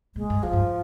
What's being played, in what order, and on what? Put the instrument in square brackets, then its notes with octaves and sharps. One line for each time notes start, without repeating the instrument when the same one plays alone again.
[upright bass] A#2 [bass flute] G#3
[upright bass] G2
[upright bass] F2 [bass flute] F3
[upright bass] G2